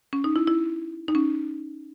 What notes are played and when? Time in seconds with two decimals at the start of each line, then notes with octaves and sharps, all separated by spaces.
0.13 C#4
0.24 D#4
0.36 E4
0.47 E4
1.08 D#4
1.15 C#4